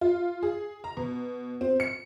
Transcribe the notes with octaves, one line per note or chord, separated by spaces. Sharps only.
F4
G#4
A#5
B2
C4
C#7